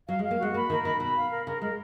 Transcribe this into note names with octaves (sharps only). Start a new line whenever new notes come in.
F#3 F5
G#3
F5
A#3
G#3 F#4
A#3 B5
D#3 A#4
D#3 B5
B2 B5
F5
A#4
C#3 A#4
G#3 A#4